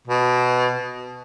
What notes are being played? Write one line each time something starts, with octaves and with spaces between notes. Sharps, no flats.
B2